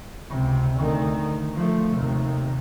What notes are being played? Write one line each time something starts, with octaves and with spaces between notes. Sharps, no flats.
C#2 C3
D2 D#3
F3 A3
D#2 C3